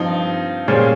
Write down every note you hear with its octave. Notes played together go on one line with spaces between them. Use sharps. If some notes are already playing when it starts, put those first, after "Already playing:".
Already playing: G2 F3 C4 D#4
A#2 G3 C#4 G#4 C5